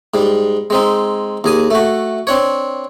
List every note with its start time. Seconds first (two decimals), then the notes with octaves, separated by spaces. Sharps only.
0.14 G#2 G3
0.70 G#3 C4 D#4
1.44 D#2 G#4 D#6
1.71 A3 F#4
2.27 C4 D4 C#5